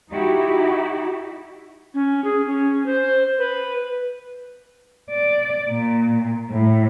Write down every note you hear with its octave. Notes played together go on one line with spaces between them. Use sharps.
D#4 E4 F#4 G4
C#4
G#4
C#4
C5
B4
D5
A#2
A2